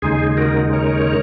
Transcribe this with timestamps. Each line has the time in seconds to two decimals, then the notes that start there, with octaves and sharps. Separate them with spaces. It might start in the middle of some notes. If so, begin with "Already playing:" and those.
0.02 D#2 C#3 G#3 D#4 G#4
0.37 F#4 A#4
0.73 A#4 C#5